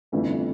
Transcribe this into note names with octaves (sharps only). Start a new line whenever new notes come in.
G1 F2 E3 A3 E4